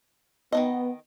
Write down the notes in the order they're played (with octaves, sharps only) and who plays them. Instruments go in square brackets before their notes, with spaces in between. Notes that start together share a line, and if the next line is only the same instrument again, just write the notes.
[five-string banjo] D#3 F#3 D#5 [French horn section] B3